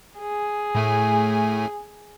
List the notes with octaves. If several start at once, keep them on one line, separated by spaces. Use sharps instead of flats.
G#4
A2 A3 G#5